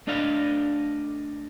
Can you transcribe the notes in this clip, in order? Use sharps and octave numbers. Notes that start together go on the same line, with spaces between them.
A3 D4 D5 D#5 F5